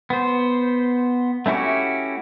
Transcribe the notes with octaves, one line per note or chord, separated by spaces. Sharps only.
B3 C5
A3 C#4 E4 F#4 G4